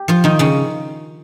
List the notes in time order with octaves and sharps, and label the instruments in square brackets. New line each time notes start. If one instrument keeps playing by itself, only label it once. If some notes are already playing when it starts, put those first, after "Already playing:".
Already playing: [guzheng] G4
F3 F4
D#3 D#4
C#3 C#4